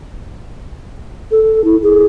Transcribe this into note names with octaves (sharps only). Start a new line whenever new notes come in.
A4
E4
G#4